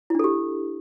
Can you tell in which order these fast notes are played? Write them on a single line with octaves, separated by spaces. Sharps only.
E4 D4 A4 G4